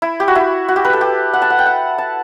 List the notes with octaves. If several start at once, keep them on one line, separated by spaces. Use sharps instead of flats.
E4
G4
F#4
E4
F#4
G4
B4
A4
G4
F#5
A5
F#5
G5
F#5
A5